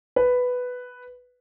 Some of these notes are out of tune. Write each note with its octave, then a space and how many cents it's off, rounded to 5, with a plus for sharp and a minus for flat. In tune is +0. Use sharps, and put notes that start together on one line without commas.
B4 +5